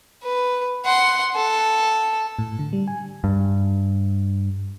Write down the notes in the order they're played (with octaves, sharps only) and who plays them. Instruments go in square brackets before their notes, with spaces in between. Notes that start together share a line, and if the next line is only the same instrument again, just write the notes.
[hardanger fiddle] B4
F#5 C6
A4
[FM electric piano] A2
D3
G3
G#5
[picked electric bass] G2